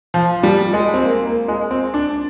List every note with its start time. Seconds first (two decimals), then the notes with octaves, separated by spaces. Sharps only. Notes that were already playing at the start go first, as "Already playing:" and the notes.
0.14 F3
0.43 G3
0.73 G#3
0.94 C4
1.04 A#3
1.26 A#3
1.48 G#3
1.71 C4
1.94 D4